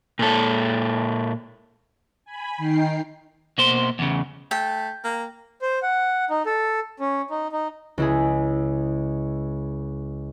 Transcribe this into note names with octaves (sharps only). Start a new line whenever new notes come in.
A#2 A4
G#5 B5
D#3 D#4 G5 C7
B2 A#3 C5 C6
E2 C#3
A3 G5
A#3
C5
F#5
D#4
A4
C#4
D#4
D#4
C#2 E4 G#4